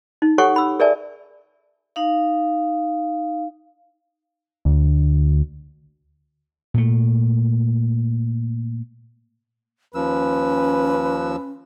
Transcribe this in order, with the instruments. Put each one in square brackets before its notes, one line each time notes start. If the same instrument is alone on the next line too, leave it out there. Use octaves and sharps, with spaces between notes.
[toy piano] D#4
G4 A4 C#5 F#5 G#5 C#6
B5 E6
G#4 A#4 D5 E5 G#5 A5
[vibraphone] D#4 F5
[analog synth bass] D2
[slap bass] A#2 A3
[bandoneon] D#2 F3 E6 [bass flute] C#4 [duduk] B4